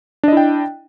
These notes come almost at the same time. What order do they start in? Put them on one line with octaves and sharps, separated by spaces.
D4 D#5 E4 G5